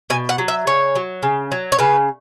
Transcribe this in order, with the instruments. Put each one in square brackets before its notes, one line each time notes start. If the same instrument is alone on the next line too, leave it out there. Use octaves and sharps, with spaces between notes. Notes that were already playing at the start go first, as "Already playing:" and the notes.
[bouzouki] B2 G#5
F#5
F#3
E5
C#3 C#5
F#3
C#3
F#3
C#5
C#3 B4